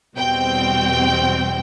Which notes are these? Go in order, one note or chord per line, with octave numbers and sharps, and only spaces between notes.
E2 B2 G3 C4 G5